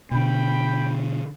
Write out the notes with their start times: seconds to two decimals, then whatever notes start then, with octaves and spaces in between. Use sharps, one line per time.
0.11 B2 D3 G5 B5